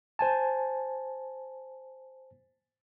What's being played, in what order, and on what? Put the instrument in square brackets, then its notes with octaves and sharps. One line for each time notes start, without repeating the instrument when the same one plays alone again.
[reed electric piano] C5 G#5 A5